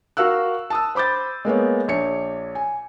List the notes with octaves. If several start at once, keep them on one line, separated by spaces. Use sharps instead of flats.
F#4 A#4 F5 E6 F#6
A5 D#6 E6
C5 B5 D6 G6 A6
G#3 A#3 B3 C#5
A#1 C#5 C#7
G#5